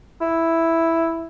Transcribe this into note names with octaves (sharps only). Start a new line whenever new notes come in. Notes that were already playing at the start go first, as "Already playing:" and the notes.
E4